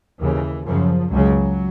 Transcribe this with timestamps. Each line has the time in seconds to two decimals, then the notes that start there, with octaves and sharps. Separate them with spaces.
0.20 D#2 C#3 E3
0.65 F#2 C#3 F3
1.11 C#2 C#3 F#3